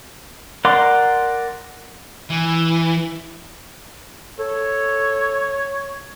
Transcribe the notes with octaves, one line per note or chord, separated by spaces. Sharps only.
A#4 D5 F#5 C6 D6
E3
A4 C#5